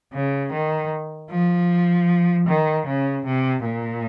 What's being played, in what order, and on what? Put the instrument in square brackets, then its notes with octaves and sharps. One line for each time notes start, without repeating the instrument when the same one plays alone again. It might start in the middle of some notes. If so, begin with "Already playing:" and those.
[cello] C#3
D#3
F3
D#3
C#3
C3
A#2